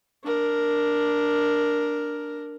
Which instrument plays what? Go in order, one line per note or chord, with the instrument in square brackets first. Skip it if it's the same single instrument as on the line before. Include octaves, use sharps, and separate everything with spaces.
[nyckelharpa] D4 A#4